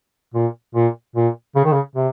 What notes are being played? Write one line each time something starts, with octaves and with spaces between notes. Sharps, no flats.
A#2
A#2
A#2
C#3
D#3
C#3
C3